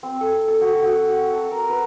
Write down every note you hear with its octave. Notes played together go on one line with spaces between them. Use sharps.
C4
A4
A4
F#4
F#4
F#5
A5
A#4
B4